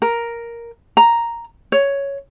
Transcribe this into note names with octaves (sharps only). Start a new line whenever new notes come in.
A#4
A#5
C#5